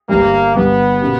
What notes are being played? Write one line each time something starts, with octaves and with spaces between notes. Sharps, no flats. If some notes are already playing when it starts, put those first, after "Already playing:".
G1 G2 G3 A#3
G1 G2 G3 B3
B2 A#3 C#4 G4